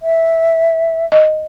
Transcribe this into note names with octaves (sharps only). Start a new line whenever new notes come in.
E5
D#5